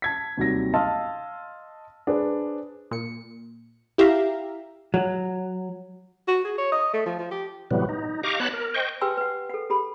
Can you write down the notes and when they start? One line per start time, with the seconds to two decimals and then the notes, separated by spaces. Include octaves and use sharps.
0.02 A5 G#6 B6
0.37 D#2 C3 F#3 G3 A#6
0.74 D#5 F5 A5 C6 E6 F6
2.07 D4 G#4 B4 C5
2.91 A#2 C#7
3.98 E4 G4 E5 F5 A#5
4.94 F#3
6.28 F#4
6.45 G#4
6.58 C#5
6.72 D#5
6.94 A3
7.06 F3
7.19 F3
7.31 G4
7.71 A2 C3 E3 F#3 G3 B3
7.89 D#4
8.23 G4 D#5 F5 A#5 C#6 D6
8.40 B3 C#5 A5 B5 F#6
8.53 A#4
8.74 C5 D#5 G5 C#6
9.01 G4 B4 G5 G#5 C6 E6
9.17 B4 F#5
9.49 A4 F#5
9.70 G4 A4 B5